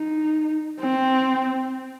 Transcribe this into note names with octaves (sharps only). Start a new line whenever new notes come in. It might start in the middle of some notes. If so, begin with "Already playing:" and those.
Already playing: D#4
C4